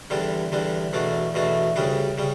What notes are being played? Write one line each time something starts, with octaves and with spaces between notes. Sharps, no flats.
E2 D3 G3 D4
E2 D3 G3 D4
E2 B2 A3 D4
E2 B2 A3 D4
D2 C#3 G3 D4
C#3 G3